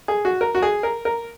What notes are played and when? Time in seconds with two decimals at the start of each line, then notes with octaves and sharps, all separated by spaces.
0.08 G#4
0.25 F#4
0.41 A#4
0.55 F#4
0.62 G#4
0.83 A#4
1.05 A#4